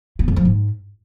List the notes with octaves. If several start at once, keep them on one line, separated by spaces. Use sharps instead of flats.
B3
F2
F3
G#2